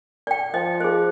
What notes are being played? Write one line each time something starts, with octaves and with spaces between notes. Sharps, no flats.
D5 G5
F3 D#5
G#4 C5